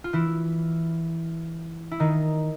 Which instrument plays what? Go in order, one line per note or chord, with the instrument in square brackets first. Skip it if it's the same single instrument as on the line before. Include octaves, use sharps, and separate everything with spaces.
[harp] F4
E3 E4
E4
D#3 D#4